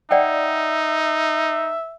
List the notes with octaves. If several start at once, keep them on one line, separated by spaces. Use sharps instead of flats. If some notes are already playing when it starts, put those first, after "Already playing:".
D#4 D5 E5 F#5 G5